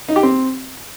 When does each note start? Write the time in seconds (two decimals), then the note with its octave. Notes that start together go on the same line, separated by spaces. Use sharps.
0.09 D#4
0.16 G4
0.23 C4